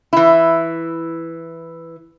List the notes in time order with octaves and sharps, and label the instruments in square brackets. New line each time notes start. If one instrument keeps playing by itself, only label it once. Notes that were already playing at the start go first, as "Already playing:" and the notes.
[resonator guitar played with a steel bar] E3 E4